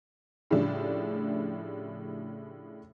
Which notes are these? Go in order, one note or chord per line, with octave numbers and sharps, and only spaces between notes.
A2 C#3 F3 G3 A3 D4